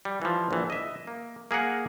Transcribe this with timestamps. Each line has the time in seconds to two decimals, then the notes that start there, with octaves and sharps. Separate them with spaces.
0.05 G3
0.22 E3 F3
0.51 A#1 E3
0.70 D#5 E5
1.07 A#3
1.51 A#3 G#4 A#4 F#5